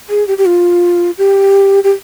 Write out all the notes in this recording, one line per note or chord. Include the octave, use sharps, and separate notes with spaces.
G#4
G4
G4
F4
G4
G4